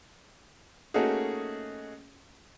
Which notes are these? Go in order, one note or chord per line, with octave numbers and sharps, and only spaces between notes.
A3 A#3 C#4 D#4 F#4 G#4